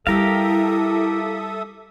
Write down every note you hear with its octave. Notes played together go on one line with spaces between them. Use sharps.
G3 E4 G4 A4 A#4 E5 F5 D#6